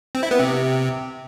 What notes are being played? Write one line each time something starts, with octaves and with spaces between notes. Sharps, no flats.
C4
E4
B3
C3